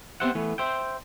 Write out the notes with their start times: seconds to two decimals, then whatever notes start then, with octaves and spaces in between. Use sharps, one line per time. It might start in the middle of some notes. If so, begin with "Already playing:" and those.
0.20 B3 C4 G4 C5 E5 F#5
0.35 E3 A3 B3
0.58 C5 E5 G5